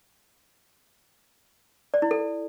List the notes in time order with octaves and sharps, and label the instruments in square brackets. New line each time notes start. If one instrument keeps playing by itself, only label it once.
[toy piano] D5
E4
A4